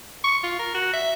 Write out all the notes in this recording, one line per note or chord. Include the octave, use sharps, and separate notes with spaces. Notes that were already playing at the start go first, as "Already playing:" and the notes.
C#6
F4
A#4
F#4
E5